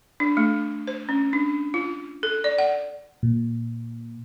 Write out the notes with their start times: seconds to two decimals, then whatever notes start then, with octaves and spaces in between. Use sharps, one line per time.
0.20 D4
0.37 A3
0.87 C5
1.09 C#4
1.33 D4
1.74 F4
2.23 A4
2.44 D5
2.58 F#5
3.23 A#2